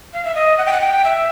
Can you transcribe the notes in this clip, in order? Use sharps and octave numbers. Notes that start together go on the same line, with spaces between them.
F5
E5
D#5
F#5
G5
F#5
G5
E5